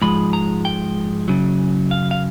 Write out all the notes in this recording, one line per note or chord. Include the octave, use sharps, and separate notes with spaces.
G#2 F3 G#3 B5
A#5
G5
F#2 C#3 F#3
F5
F5